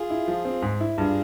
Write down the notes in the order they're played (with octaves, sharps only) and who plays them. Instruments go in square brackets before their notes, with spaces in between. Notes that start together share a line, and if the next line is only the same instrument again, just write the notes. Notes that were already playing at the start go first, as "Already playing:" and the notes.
Already playing: [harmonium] F4 G#4
[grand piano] E4
F3
C4
G#2
E4
[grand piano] G2 [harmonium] F4 G#4